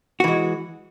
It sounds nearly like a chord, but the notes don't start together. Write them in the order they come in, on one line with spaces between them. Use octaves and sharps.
F#4 E3 G#3